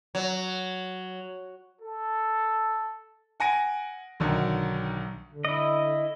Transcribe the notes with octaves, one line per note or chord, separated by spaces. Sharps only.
F#3
A4
F#5 G#5 A#6 D7
B1 D3 D#3
D3
E4 D#5